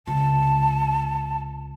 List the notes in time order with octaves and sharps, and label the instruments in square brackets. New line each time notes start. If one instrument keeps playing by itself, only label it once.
[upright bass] C#2 C3 [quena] A5